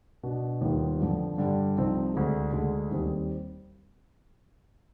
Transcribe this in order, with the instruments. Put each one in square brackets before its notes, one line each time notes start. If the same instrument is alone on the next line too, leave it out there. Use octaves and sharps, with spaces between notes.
[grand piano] B2 B3 D4
D#2 D#3 G3 B3 F4
F2 D3 F3
G2 D3 G3
C2 C3 F3 C4 D#4
D2 D3 G#3
D2 D3 G#3 D4
D#2 D#3 G3 C4